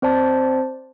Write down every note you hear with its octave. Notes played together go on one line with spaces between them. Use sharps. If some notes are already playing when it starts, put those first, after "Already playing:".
C4 C5 D5 A5